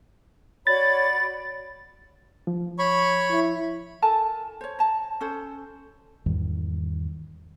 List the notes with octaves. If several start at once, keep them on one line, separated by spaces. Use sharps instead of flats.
F#4 C#5 D5 B5 A6
F3
C#5 B5 C#6
E4
A4 A#4 G#5 A5
C5 C#5
A5 A#5
C#4 A4 C5
E2 G#2 D#3 G3